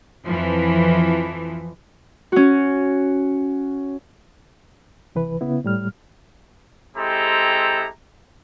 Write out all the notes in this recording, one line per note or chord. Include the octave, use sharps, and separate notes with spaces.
F2 E3 F3
C#4 F#4
C2 E3 B4
C#3 B3 E4
A2 G3 F6
G#3 C4 E4 G4 A4 A#5